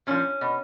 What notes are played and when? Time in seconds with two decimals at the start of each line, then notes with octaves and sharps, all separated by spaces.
0.07 A#2 F3 C#4
0.41 B2